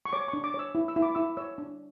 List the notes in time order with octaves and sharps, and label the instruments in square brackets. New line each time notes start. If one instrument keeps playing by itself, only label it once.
[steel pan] C#6
C#5 D6
C#6
D4
D6
C#5 E6
E4
E6
E4
D6
E4 E6
C#5 E6
D4